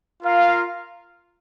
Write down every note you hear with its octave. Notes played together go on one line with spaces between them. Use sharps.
F4 A#4 F5